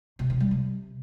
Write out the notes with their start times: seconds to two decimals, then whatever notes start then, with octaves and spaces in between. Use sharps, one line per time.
0.19 C3
0.30 D#3
0.40 G3
0.51 C3